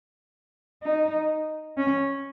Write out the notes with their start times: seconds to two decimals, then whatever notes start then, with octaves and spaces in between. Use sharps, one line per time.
0.83 D#4
1.77 C#4